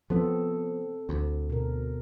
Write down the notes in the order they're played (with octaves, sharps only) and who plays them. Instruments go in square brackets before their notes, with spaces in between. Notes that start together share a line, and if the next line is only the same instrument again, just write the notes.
[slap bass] F3 B3 [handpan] C4 A4
[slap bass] D2
[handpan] B2 A#4